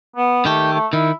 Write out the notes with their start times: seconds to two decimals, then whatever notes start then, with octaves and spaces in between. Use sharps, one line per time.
0.16 B3
0.45 D#3 A3 G4
0.73 A3
0.93 D#3 E4